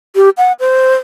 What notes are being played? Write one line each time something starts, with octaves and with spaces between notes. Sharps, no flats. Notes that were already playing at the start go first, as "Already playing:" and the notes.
G4
F#5
C5